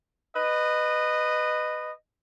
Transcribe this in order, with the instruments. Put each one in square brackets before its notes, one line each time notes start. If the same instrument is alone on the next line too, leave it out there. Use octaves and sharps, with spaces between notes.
[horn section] B4 D#5